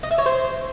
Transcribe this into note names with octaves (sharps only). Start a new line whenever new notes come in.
D#5
E5
C#5
C5